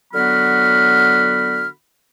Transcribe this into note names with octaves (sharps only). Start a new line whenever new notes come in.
D3 F#3 B3 F#4 B5 F6